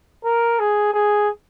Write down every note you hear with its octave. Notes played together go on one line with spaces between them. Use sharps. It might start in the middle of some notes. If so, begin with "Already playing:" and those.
A#4
G#4
G#4